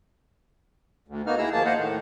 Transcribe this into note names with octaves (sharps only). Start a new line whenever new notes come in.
D2
A#3 B3 D#4 F#4 F6
E4 G#4 A#5 E6
D#2 F3 A#3 G#4 A5
C5 D#5 F5 F#5
A2 D#3 A3